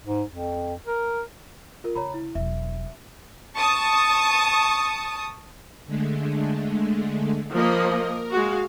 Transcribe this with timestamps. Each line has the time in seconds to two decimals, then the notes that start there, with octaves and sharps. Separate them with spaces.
0.06 G#2
0.31 F2
0.86 A#4
1.84 F4 A#4
1.95 C#3 C#5 A#5 B5
2.14 E4
2.35 E1 F#3 E5
3.57 A5 C#6 D#6
5.87 D3 G#3 A3
7.53 F3 A#3 D#5 B5
7.87 A#4
8.31 G#3 F#4 F5